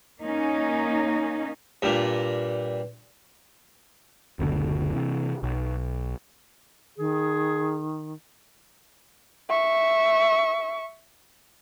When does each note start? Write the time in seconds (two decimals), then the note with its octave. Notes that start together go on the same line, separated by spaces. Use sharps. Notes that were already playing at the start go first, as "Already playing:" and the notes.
0.22 A#3 C#4 D#4
1.82 G2 A#2
4.39 F#1 D2 B2 D3
4.94 C3 E3
5.43 B1
6.98 D#3 G#4
9.50 E5 C#6